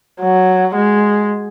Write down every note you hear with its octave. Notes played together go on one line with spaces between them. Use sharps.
F#3
G#3